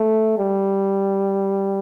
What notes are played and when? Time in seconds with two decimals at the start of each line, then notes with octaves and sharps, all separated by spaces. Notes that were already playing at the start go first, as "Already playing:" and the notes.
Already playing: A3
0.38 G3